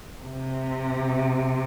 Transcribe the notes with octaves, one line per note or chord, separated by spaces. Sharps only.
C3